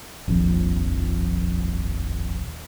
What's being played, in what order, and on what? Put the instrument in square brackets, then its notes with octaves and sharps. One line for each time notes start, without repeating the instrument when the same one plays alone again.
[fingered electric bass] D#1 A#1 F2